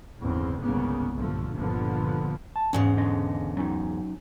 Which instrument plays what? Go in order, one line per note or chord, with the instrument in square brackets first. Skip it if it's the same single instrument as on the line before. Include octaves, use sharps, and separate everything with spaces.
[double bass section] G1 E2 A2 C#3 C4
G1 C2 G#2 C#3 A#3 B3
B1 G2 A#2 D3 F3 A3
G1 D#2 A#2 D3 F3 B3
[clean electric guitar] A5
[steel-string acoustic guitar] E2 G#2 C#3 [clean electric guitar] C#4
[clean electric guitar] D3 C#4 D#5
F#3 C#4 D#4